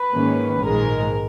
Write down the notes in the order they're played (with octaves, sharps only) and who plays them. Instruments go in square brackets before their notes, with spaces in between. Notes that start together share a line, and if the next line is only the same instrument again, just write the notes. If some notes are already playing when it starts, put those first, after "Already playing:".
Already playing: [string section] B4
G#2 D#3 A#3 C#4
A#1 G#2 D#3 G#3 A#4